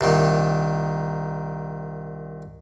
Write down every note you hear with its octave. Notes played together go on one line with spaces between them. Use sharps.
C2 A#2 D#3